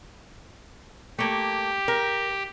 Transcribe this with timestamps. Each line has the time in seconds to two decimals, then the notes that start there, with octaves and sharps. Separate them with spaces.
1.19 A3 A#3 G4
1.88 A#4